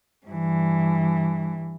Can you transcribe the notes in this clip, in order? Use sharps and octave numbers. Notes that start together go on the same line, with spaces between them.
G2 E3